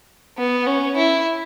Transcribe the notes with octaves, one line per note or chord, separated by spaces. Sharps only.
B3
C#4
E4